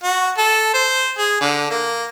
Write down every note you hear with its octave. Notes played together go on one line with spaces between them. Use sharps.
F#4
A4
C5
G#4
D3
A#3